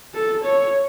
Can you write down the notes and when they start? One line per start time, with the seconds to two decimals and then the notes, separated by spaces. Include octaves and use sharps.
0.14 A4
0.44 C#5